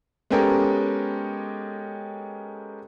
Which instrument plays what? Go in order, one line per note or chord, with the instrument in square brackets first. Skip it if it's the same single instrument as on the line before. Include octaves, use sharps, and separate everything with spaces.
[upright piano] G#3 B3 C#4 G4 A4 A#4